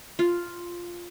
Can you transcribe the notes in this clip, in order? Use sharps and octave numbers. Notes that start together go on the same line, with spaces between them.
F4